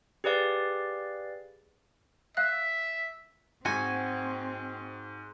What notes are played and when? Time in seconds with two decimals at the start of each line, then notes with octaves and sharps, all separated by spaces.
0.24 G4 G#4 B4 D5 F5
2.37 E5 F5 F#6
3.65 G#2 C4 F#4 G#5